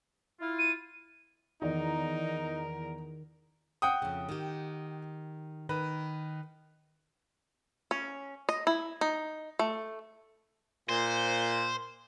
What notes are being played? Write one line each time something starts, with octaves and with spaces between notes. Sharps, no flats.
E4 F4
D#7
E2 D#3 D#4 A#4 D5
F#5 G5 D#6
F2 C#3
D#3 G4
D#3 B4
C#4
D#5
E4
D#4
A3
A#2 C5